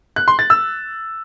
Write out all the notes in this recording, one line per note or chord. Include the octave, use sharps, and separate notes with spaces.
F#6
C6
A6
E6